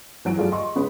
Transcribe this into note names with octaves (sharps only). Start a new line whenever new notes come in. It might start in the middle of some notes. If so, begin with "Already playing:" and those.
E3 F#3 D7
F#3 G3 A3 F4 G4 G#4
D#5 C6 C#6
C#3 G#3 B3 C#4 B4 C#5